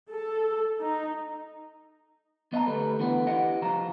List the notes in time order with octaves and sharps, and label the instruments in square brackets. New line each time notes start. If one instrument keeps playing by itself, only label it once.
[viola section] A4
D#4
[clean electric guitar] B3 D#5 E5 A5 A#5
D2 G3 A3 B4
D3 E3 B3 D4
E4 G4 B4 D#5 F#5
C2 C3 F3 F4 A#5